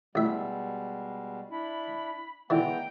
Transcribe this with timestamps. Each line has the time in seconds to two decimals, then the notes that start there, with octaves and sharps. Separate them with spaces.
0.15 A1 B2 G3 G#3 E5
1.51 D4 E4 B5
2.50 D3 E3 G#3 B3 G5 A#5